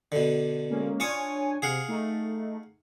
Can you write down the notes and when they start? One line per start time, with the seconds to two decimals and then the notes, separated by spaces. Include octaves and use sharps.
0.12 B2 D3
0.70 G#3 A#3 C#4
1.00 D4 F4 C#5 G#5 C#6 D#6
1.62 C3 G#4 F5 F#5
1.88 A3 D#4